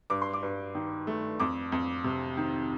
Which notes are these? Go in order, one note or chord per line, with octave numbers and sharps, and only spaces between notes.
G2 D6
C6
D6
G2
D#3
A3
F2 D6
F2
C3
D#3